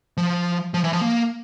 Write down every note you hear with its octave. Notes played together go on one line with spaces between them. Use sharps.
F3
F3
E3
F3
A#3